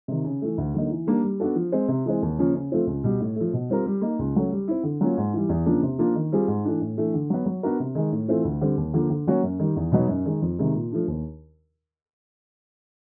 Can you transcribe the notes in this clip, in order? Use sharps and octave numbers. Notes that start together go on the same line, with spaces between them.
C3 D#3
C#3
E3 A3
D2
D3 F#3 A#3 D#4
E3
G3 A#3 D4
G3
B3 D4 F#4 A4
F3
G#3 C4
C3
E3 G#3 C4
D#2
C#3 F3 A#3 C#4
C#3
F3 A3 C4 F4
C#2
B2 G3
A2
F3 A3
B2
G3 C4 F4 A#4
G3
A#3 D#4
C#2
C#3 F#3 A3
G3
C4 E4
D3
F#3 A#3 C#4 F4
G#2
E3 G3
E2
C#3 F3 A#3 D4
C3
F3 A#3 D4 F4
D#3
G3 C4 F4 G#4
G#2
E3 A3 D4
A2
E3 A3 D4
D3
F#3 B3
F#3
B3 D4 F#4 A#4
C3
D#3 G#3
A2
E3 A3 C4 F4
D2
D3 G3 C4
D#2
D3 F3 A#3
D3
F#3 A#3 C#4 F#4
F#2
D#3 G3
E2
B2 F#3 B3 D#4
F#2
D#3 G#3
F2
C3 D#3 G#3
A#2
F3 A3 D4
D#2